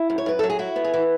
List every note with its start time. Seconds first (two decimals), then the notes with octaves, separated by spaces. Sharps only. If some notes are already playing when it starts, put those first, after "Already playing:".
Already playing: E4
0.10 F#2
0.18 C#5
0.26 F#2 B4
0.39 F#3 A4
0.50 G#4
0.59 E4 F#4
0.76 B3
0.84 G#4
0.93 E3 F#4